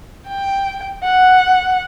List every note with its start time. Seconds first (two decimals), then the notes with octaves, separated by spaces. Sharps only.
0.28 G5
1.04 F#5